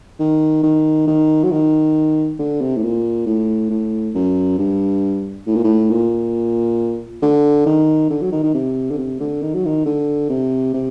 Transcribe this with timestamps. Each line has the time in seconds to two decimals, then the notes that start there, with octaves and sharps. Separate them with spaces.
0.19 D#3
0.63 D#3
1.07 D#3
1.44 F#3
1.51 D#3
2.39 D3
2.61 C3
2.76 A2
2.83 A#2
3.26 A2
3.70 A2
4.15 F#2
4.58 G2
5.47 A2
5.55 A#2
5.64 A2
5.90 A#2
7.22 D3
7.66 D#3
8.10 D3
8.21 F#3
8.32 D#3
8.43 D#3
8.54 C3
8.91 D3
8.98 C3
9.20 D3
9.42 D#3
9.54 F#3
9.65 D#3
9.85 D3
10.30 C3
10.74 C3